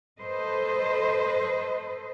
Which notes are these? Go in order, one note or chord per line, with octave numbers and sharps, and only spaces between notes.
A4 B4 C5 D#5